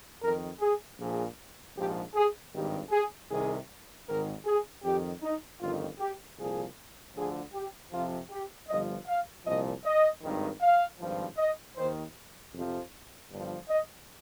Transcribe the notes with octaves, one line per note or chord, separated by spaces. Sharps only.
F2 D#3 A#4
G#4
A#1 A#2 F3 G#4
A#1 G#2 F3 G4
G#4
G#1 G2 D#3 G4
G#4
C2 C3 D#3 G#4
G#1 G#2 D#3 A#4
G#4
F2 D#3 G4
D#4
G1 F2 D#3 F4
G4
C2 A#2 F3 G#4
D2 D3 F3 G#4
G4
F2 C3 F3 F4
G4
G1 G2 F3 D#5
F5
C2 A#2 F3 D#5
D#5
G#1 G2 D#3
F5
G#1 G2 F3
D#5
D#2 D#3 C5
F2 C3 F3
G1 G2 F3
D#5